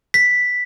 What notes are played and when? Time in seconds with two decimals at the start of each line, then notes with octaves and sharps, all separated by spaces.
0.14 B6